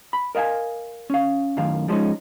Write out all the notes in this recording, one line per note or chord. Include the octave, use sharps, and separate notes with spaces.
B5
A#4 D#5 F5 G5 G#5
C#4 F5
F#2 A2 D#3 F5
F3 G3 G#3 C#4 D#4